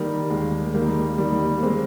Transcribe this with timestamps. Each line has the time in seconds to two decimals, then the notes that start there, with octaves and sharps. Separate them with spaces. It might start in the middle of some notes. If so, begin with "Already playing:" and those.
Already playing: D#3 G3 A#3
0.30 D#2 G#3
0.68 G#3
0.74 D#3 G3 A#3
1.18 D#3 G3
1.58 A#3
1.63 G#3 C4